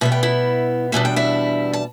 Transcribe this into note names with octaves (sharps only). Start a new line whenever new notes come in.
B2 G3 B3 E5
G5
E4 E5
E2 B2 G3 D4 E5
G5
E4 E5
A5